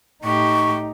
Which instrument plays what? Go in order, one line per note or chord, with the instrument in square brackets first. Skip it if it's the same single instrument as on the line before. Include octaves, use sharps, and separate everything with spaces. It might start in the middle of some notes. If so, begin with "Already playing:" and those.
[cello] A2 G4 [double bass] D#4 [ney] C#6